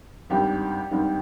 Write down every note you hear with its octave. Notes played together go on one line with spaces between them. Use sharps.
G#1 G2 D#3 G4
G#1 G2 D#3